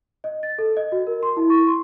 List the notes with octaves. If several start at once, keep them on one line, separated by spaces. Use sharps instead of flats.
D#5
A6
A4
D#5
F#4
A#4
C6
E4
C#6
C6